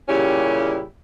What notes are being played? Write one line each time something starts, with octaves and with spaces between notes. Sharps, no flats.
A#2 C#3 G3 C#4 E4 G4